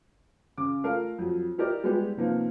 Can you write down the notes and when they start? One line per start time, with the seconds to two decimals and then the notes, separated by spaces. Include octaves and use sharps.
0.58 C#3 D6
0.84 A3 F4 A4 A#4 F5
1.18 F2 F#3
1.58 E4 G4 A#4 D5 D#5
1.84 G3 G#3 B3 E4 G4
2.17 C3 F3 A#3 B3 D#4 F4